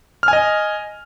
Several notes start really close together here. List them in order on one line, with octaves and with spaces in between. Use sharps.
F6 G#5 D#5